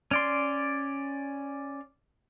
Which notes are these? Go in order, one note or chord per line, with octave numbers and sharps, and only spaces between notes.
C#4 D5 C6